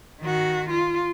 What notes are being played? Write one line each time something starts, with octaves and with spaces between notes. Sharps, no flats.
D#3 F#4
F4